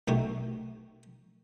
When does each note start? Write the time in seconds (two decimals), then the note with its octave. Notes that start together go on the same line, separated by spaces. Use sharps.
0.08 B1 D#3 A3 F#4 G4